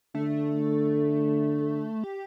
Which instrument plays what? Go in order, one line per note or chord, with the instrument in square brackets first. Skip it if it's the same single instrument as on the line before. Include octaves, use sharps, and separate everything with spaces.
[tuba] D3 [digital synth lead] A3
[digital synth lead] G4